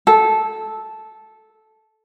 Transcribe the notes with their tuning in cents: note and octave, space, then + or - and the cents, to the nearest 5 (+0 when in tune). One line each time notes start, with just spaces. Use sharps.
A4 -10